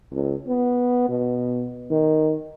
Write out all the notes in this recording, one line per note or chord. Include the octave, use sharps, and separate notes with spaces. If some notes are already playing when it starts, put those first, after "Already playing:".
C#2
B3
B2
D#3